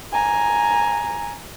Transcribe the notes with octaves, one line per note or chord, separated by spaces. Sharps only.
G#5 A#5